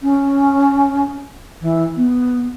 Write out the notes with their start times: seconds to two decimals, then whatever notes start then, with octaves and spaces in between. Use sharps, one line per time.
0.01 C#4
1.61 E3
1.96 B3